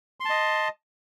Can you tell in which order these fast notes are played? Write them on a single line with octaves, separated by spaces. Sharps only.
C6 A5 D#5